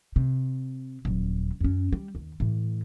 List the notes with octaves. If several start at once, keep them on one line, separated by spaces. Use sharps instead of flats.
C3
D#1 F#3
F#2 C#4
G3
D#2
A2 E3